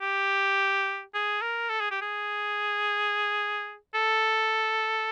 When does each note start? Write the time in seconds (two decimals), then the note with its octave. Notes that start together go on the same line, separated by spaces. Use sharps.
0.02 G4
1.14 G#4
1.42 A#4
1.70 A4
1.81 G#4
1.91 G4
2.02 G#4
3.94 A4